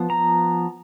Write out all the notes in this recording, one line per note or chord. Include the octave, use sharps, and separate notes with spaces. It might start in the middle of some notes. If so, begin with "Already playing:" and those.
Already playing: F3 B3
A#5